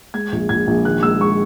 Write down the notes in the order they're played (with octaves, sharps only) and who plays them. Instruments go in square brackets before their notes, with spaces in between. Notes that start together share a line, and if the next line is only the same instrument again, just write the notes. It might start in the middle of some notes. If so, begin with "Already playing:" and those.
[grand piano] G#3 G#6
A#1
A#1 G#6
A#1
D#3 F#6
G#3 E6
G#3 C#6